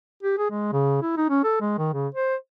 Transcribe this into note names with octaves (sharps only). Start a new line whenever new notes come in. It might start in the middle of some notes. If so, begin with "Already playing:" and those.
G4
G#4
G#3
C#3
E4
D#4
C#4
A4
G#3
D#3
C#3
C5